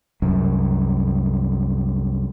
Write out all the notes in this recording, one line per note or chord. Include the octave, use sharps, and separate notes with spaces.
C2 F#2